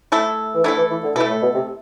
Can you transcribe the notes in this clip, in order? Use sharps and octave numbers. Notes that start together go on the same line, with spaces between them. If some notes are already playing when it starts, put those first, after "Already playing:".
A3 E4 A4
E3
D3 A3 E4 A4
E3
E3
D3
B2 A3 E4 A4
A2
B2
C3